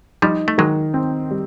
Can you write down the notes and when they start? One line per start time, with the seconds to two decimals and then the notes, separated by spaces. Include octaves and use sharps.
0.22 F3 G3 D#4
0.48 A3
0.58 D#3 F#3 G#3
0.94 C4
1.31 G3